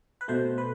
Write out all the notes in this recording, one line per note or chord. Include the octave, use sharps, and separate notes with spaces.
B4
B2 A3 C5
B4